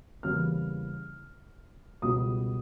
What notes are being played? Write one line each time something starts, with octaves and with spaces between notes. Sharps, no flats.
E2 C#3 E3 G3 A#3 F6
C#2 B2 G3 D#6